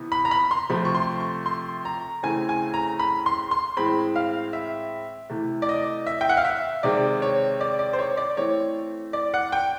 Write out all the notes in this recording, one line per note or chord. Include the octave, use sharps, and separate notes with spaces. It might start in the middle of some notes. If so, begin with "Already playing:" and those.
Already playing: C3 E3 B3
B5
A#5
B5
C6
C3 F3 A3 C4 B5
C#6
C6
C#6
C6
A#5
C#3 E3 A3 C4 G#5
G#5
A#5
B5
C6
C6
A2 E3 G#3 C4 B5
F5
E5
C3 E3 A3
D5
D#5
E5
G5
F#5
F5
E5
C3 D#3 G#3 C4 D5
C#5
D5
D5
C5
C#5
D5
E3 A3 C4 C#5
D5
F#5
G5